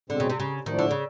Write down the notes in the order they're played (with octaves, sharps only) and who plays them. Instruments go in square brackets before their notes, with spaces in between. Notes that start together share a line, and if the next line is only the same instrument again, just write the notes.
[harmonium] B2 G#3 C4 [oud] D3
[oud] C#3
C3
C#3
[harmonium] A2 F3 A3 D4 [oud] D#3
[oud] D3
C#3